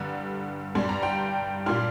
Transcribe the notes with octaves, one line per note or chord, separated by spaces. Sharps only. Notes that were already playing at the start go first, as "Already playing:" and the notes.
Already playing: G2 D3 G3 A#5
G2 G3 D4 C6
A#5
G5 C6
A#2 G3 D4 C6 F6